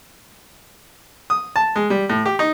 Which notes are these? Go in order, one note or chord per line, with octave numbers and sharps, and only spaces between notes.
D#6
A5
G#3
G3
A2
G4
D#4